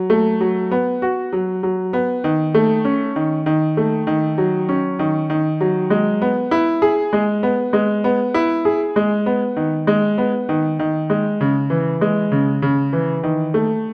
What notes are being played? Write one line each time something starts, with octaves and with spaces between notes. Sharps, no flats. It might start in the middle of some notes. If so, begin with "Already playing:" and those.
Already playing: F#3
A3
F#3
B3
F#4
F#3
F#3
B3
D#3
A3
C#4
D#3
D#3
A3
D#3
F#3
C#4
D#3
D#3
F#3
G#3
B3
E4
G#4
G#3
B3
G#3
B3
E4
G#4
G#3
B3
D#3
G#3
B3
D#3
D#3
G#3
C#3
E3
G#3
C#3
C#3
E3
D#3
A3